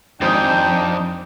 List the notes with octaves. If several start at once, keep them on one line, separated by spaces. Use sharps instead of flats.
G#1 F2 C4 D4 D#4 G5 D#6